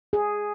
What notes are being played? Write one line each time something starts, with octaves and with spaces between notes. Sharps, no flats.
G#4